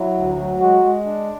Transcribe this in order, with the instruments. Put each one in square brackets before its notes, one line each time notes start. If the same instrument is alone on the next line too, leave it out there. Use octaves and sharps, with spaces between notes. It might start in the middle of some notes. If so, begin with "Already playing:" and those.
Already playing: [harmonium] F#3 [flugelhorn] E4
[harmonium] D2
F#3
[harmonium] G#3 [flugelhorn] F#4
[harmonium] G#3
D4